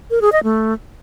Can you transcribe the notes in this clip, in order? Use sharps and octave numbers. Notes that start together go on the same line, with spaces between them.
A#4
G#4
D#5
A3